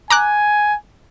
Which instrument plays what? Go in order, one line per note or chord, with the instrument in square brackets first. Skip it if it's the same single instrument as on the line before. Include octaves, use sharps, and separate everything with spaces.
[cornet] G#5 [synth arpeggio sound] A#5 D6 F#6